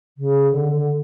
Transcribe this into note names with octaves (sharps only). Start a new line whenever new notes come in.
C#3
D3
D3